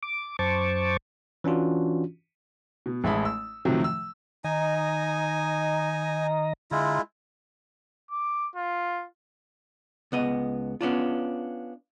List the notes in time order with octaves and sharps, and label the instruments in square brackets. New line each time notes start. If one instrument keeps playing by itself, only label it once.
[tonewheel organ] D6
F#2 C5 A5 C#6 D6
[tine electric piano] E3 C#4 D4 F4 F#4
[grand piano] B2
A1 G#3 E5 A5 B5 D#6
E6
A2 C3 D#3 F3 F#3
E6
[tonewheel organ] D#3 D#5 A#5 [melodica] D#4 G#5
[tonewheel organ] D3 A#5 [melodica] G#3 E4 F4
[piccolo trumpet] D6
F4
[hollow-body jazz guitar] C#2 B3 D#5
B3 C#4 D4 F4